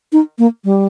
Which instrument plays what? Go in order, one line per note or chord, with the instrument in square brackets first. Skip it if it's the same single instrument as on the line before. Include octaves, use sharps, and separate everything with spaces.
[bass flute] D#4
A#3
G3